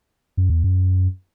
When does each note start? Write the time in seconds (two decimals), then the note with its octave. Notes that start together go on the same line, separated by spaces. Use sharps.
0.37 F#2
0.50 E2
0.64 F#2